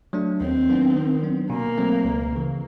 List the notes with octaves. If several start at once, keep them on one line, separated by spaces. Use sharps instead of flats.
F#3 A3 D4
D#2 C4
D#3 F#3 B3 D4
D#3
F#3 B3 D4
B2 A#3
F#3 A3 C4
C#2
C#3 E3